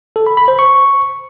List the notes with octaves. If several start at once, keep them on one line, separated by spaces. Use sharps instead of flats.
A4
B5
B5
C5
C#6